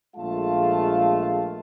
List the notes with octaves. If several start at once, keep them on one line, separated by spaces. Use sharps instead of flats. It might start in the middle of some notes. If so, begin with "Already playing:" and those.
A#1 G#3 A3 F4 F5 A5